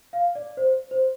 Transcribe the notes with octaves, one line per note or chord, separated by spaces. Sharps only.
F5
D5
C5
C5